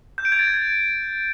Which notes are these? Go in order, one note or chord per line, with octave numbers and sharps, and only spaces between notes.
G6
D7
G#6
A6